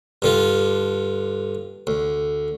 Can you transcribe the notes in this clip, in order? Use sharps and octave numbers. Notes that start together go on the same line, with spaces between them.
G2 D3 F4
D2